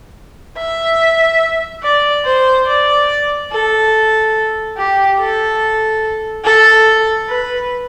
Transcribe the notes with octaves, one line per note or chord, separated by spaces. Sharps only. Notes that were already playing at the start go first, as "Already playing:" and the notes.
E5
D5
C5
D5
A4
G4
A4
A4
B4